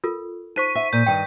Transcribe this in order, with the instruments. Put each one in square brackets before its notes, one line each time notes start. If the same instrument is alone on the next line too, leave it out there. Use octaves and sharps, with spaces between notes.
[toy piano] F4 A4 A#4
[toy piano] D#4 C5 [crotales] C#6 B6 D#7
[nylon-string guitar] E5 [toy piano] F#5
[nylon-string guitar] A#2 [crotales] G6
[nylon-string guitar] G2 D#3 [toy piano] G5